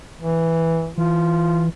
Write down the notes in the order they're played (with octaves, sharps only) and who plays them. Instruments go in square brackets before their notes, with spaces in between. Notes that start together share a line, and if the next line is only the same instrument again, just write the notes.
[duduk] E3
[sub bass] E3 [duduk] F4